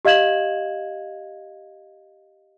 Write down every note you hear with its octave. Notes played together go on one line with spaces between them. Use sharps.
G4 D#5 F5 G#6 E7 F#7